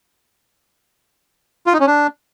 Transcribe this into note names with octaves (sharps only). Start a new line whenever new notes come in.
F4
D#4
C#4
D4